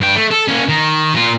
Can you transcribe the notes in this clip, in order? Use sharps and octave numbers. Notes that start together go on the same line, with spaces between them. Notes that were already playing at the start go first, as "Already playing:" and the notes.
G2 G5
A3
A4
A#3 C#4
D#3
A#2 F4